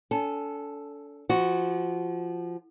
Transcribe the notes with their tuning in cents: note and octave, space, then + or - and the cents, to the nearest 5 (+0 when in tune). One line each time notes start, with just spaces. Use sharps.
D4 -45 A4 +0 G#5 +0
F3 -15 F#4 +0